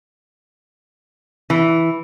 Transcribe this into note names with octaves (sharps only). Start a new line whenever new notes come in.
E3